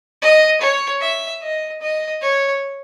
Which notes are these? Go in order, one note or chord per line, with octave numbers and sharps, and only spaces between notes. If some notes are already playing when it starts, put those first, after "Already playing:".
D#5
C#5
E5
D#5
D#5
C#5